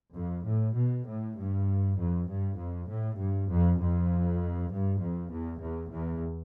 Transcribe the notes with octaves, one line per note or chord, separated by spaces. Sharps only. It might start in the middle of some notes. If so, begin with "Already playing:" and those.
F2
A2
B2
A2
G2
F2
G2
F2
A2
G2
F2
F2
G2
F2
E2
E2
E2